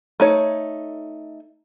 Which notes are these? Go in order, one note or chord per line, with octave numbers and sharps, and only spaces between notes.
A3 D#4 C#5